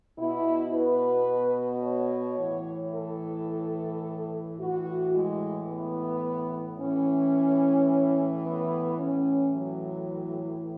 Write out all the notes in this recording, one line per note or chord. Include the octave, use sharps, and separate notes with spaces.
B2 E4
B4
C#5
A2 E3
A4
A2 E3 F#4
G#3
B3
A2 E3 C#4
B3
A2 E3 C#4
F#3